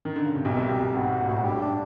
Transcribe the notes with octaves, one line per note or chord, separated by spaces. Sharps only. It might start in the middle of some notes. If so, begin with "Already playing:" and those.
D#3
D3
C#3
C3
B1 B2 G4
C2 C3
B1 B2 G4
B1 B2
G#1 G#2 F#4
F#4
A#2
A2 F#4
G#2
G2 G4
D4